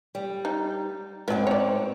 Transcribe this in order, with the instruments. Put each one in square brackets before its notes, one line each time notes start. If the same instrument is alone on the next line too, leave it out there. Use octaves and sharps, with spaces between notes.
[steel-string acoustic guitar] G3
[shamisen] D#4
[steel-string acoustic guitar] G#2 C4 [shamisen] F#3 B3
[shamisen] C#5 D5